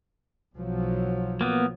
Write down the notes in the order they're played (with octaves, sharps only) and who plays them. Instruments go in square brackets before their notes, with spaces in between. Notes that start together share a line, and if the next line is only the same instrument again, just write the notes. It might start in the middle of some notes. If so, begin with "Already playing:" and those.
[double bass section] B1 F3 F#3
[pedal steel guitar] A#3 B3